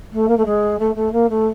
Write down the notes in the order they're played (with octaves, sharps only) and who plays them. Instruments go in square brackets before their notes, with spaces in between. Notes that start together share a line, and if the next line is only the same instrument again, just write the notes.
[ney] A3
A#3
A3
G#3
A3
A3
A#3
A3